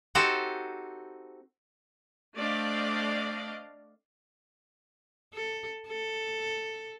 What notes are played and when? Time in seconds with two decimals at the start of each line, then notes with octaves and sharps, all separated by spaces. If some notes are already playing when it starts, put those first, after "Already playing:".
0.15 C4 D#4 F#4 G4 A4 C5
2.36 A3 C4 D4 D5 D#5 F5
5.34 A4
5.88 A4